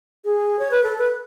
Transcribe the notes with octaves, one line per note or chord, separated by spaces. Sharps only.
G#4
C#5
B4
A4
B4